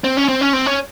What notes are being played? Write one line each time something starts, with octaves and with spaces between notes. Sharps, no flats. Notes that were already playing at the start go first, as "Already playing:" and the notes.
C4
C#4
C4
C#4
C4
C#4